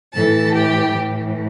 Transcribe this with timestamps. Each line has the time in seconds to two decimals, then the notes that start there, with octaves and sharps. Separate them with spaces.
0.13 A2 E3 A4 A5
0.53 G4 G5
0.92 A2 E3